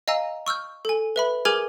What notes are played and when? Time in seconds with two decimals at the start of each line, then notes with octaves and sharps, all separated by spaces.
0.08 D#5 F5 G#5 A#5 E6
0.47 C#6 E6 F6 G6
0.85 A4 G#5
1.16 B4 E5 B5
1.45 G#4 A#4 G#5 D6 F6 G#6